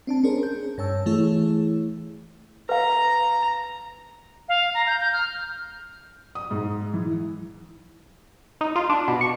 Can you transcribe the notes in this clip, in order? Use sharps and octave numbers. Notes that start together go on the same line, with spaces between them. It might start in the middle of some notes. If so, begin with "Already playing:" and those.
C4 D4 A5
C#4 D4 G#4 A#4 C5
G6
G2 C#5 A5 E6
E3 A3 E4 G#4 C#5
B4 F5 A#5
F5
A#5
G6
G6
F6
D#6
G#2
E3
D#4
F4
D4
B2
C#6